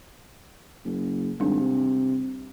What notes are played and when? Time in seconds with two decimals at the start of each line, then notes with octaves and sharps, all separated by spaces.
0.84 F#1
1.40 G#1 G3 D4
1.59 C3